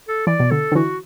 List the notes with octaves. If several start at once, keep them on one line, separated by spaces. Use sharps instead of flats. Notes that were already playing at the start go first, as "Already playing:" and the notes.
A4
E3 D5
B2
D3 A4
D3
E3 F#4